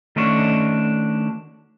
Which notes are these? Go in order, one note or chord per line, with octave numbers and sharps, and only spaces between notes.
D#3 A3 C#4 D4 F#4